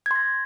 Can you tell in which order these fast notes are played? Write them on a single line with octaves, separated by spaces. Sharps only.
G#6 C6 A#6